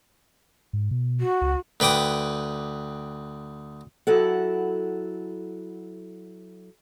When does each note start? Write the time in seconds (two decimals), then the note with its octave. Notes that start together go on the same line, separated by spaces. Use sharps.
0.73 G#2
0.91 B2
1.20 F#4
1.41 C#2
1.80 D2 B4 G5 D6 D#6
4.07 F#3 E4 A4 F#5